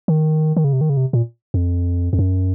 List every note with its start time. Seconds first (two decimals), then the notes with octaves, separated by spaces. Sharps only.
0.08 D#3
0.56 D#3
0.64 C#3
0.73 C3
0.81 D#3
0.90 C#3
0.97 C3
1.13 A#2
1.54 F2
2.13 F2
2.19 F#2